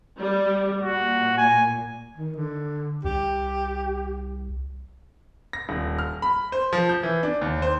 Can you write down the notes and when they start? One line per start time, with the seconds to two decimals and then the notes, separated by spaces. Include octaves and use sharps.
0.19 G3
0.82 A#2 F#4
1.38 G#5
2.17 D#3
2.36 D3
3.05 C2 G4
5.53 A#6
5.69 D#1
5.99 F6
6.22 B5
6.52 C5
6.73 F3
6.89 G6
7.03 E3
7.23 D4
7.41 D#2
7.62 C5